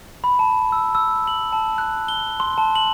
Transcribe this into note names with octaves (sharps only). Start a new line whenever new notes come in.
B5
A5
E6
E6
F#7
A5
F#6
G7
C6
A5
F#7